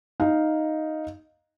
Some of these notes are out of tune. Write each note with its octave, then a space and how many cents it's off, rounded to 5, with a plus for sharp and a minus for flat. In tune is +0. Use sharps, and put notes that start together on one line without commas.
D#4 +0 F5 +0